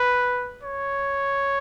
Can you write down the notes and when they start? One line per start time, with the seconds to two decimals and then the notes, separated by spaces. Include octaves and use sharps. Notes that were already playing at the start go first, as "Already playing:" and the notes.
Already playing: B4
0.63 C#5